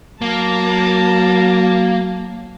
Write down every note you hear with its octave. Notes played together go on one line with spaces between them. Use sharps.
F#3 A#3 A5 A#5